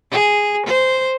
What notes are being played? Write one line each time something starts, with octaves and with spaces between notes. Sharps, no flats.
G#4
C5